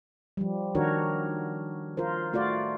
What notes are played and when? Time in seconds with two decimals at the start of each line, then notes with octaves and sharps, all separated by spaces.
0.37 F3 G3
0.75 D#3 D4 F#4 A#4 C#5
1.97 F4 A#4 C5
2.33 A3 F4 F#4 D5